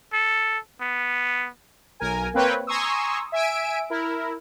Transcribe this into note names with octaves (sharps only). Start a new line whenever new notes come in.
A4
B3
B1 A#4 G#5
A#3 C4 B4 C#5 G5
G#5 A#5 C6 C#6 D#6 E6
E5 G#5 E6 D7
E4 A#4